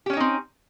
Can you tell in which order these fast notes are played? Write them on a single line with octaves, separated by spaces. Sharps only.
G4 C#4 C#5 D#4 C4